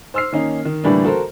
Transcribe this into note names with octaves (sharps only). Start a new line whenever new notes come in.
C5 C6 E6 F6 C7
D#3 A#3 C#4 D#4
D#3
A2 D3 E3 G3 A#3 D4
F#4 A4 A#4 C5